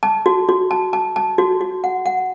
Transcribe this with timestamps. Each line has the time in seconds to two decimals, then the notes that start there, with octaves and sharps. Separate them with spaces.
0.03 A5
0.26 F#4
0.49 F#4
0.71 A5
0.93 A5
1.16 A5
1.38 F#4
1.61 F#4
1.84 F#5
2.06 F#5